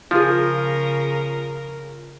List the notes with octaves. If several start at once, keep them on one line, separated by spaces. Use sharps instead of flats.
C#3 F3 F4 G#4 A#4